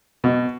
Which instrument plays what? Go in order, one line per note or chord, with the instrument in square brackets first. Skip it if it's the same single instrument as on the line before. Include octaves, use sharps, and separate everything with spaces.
[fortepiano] B2